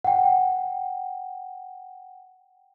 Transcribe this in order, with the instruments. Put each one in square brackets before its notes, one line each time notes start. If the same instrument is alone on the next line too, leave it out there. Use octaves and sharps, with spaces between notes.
[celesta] F#5 G5